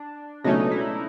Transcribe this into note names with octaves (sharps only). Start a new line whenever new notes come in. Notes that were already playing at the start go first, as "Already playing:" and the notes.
Already playing: D4
C#2 B2 F#3 A3 C#4 D#4
E4